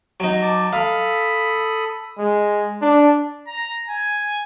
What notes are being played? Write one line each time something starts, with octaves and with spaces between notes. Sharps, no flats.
F#3 D#4
A5 D6
A4 F5 B5 D#6
G#3
D4
A#5
G#5